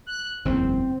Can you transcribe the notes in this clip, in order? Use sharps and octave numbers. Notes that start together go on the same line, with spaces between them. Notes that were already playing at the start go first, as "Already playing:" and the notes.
F#6
F#1 E2 G#2 C4